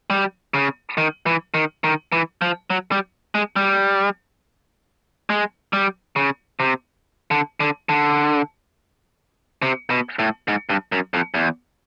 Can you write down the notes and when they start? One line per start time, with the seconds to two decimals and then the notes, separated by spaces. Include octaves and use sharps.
0.10 G3
0.54 C#3
0.98 D#3
1.26 E3
1.54 D#3
1.84 D#3
2.12 E3
2.42 F3
2.70 F#3
2.92 G3
3.35 G#3
3.56 G3
5.30 G#3
5.73 G3
6.16 C#3
6.60 C3
7.31 D3
7.60 D3
7.89 D3
9.62 C3
9.90 B2
10.19 A2
10.48 G#2
10.69 G2
10.92 F#2
11.14 F2
11.34 E2